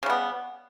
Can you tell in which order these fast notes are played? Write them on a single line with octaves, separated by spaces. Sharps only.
C#3 G3 B3